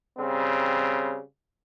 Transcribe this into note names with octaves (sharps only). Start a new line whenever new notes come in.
C#3 G3 C4